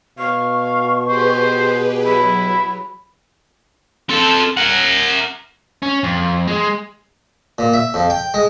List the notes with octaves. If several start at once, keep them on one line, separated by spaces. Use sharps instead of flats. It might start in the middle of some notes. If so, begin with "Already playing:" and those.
B2 F5 C#6
G4 G#4 B4 C5
F#3 E4 B5
C4 A4
A#4 F#5
C#4
F2
G#3
A#2
E5
F2
G5
G#3